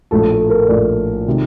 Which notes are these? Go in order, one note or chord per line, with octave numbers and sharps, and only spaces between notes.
A#1 A2 A3 A4
A4
A#4
A#1 A2 A3 D5
C3 D#3